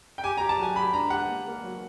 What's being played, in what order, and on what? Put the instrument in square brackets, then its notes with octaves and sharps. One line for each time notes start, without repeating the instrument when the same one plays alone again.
[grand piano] G5
[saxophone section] G4 [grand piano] G#5
[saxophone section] G4 [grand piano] A#5
[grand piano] A5
[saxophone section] F#3 [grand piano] G#5
[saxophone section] G4 [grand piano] B5
[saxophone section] D4 [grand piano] A#5
[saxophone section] G4 [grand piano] F#5
[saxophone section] A#3
A#3
F#3